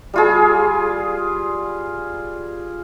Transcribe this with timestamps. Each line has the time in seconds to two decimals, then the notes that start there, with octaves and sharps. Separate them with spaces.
0.14 G3 F4 G#4